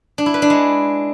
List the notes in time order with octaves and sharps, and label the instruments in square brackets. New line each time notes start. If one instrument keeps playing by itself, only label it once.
[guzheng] D4
E4
B4
D4
G#3